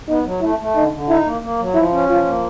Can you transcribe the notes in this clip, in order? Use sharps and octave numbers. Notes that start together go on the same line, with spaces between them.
B3 D#4
F#3
A3 E4
A3
D3 D#4
D3
D#4 E4
A#3
A#3
F#3
F3 E4
C#4
F3 F4
A#3